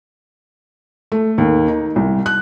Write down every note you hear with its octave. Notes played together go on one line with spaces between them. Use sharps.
A3
D#2
D#4
C2
F#6